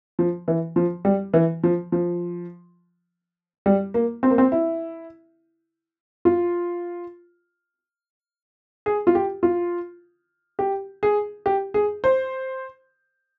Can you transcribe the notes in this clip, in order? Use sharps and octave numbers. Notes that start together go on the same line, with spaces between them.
F3
E3
F3
G3
E3
F3
F3
G3
A#3
C4
A#3
C4
E4
F4
G#4
F4
G4
F4
G4
G#4
G4
G#4
C5